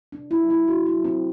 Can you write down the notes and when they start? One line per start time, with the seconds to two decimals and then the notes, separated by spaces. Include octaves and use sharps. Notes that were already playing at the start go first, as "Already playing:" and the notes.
0.12 C3 D4
0.31 E4
0.40 F#3
0.45 A3
0.50 E4
0.68 C3 F#4
0.86 E4
0.95 F#3 A3
1.04 C4